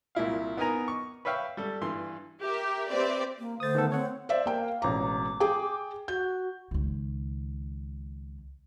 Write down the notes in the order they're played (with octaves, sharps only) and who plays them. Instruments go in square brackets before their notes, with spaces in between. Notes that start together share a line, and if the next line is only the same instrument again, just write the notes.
[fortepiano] C2 A#2 E4 F5
B3 D#4 A#4 G#5 A#5
C#6
B4 C#5 E5 F5 G5
G3 A4
G2 E3 C6
[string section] G4 A#4 E5
C4 G4 B4 C5 D5 E5
[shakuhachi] A#3
[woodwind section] D3 A3 [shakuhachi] C5 [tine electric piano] D#6 A6
[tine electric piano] D#3 B3 A4
[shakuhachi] C4 [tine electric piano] C#5 F#5
[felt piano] C5 D5 E5
A#3 G5
[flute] F5
[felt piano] E1 A1 A#5 [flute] D6
[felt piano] G#4 G5
[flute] F#4 [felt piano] G6
[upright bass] C#2 D#3